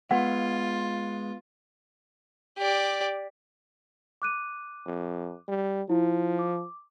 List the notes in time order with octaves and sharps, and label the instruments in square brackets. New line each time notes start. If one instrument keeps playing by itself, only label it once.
[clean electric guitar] G#3 [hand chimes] B3 B4 G#6 [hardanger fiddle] F4 [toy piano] F#5
[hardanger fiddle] G4 D5
[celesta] D6 F#6 D#7
[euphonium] F2
G3
[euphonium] F3 [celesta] E4
[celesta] D6